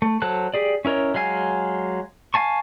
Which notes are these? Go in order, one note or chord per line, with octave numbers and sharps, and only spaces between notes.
A3
F#3 A4 C5 A5 F#6
G4 G#4 D5
C#4 E4 A#4 C#5 D#5
F#3 G#3 F5 G#5 F6
F5 G#5 A5 C#6